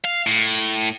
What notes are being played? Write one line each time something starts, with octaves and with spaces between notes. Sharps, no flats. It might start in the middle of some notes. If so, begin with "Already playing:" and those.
F5
A2